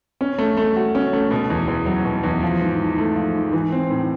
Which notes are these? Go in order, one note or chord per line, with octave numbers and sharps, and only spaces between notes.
C#4
A3
A3
F#4
C#4
A3
B2
E2
E2
F#3
B2
E2
F3
G#2
G#2
A3
F3
G#2
E3
C4
A2